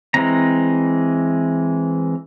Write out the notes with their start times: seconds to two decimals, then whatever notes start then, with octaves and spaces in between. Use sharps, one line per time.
0.14 E3 G#3 C4 A#5